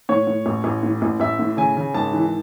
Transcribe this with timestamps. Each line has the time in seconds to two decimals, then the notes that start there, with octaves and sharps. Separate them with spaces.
0.09 A2 C#5
0.27 A2
0.46 A1
0.64 A1
0.83 A2
1.02 A1
1.20 A1 E5
1.39 A2
1.57 C#3 G#5
1.77 C#3
1.94 G#1 A5
2.13 E3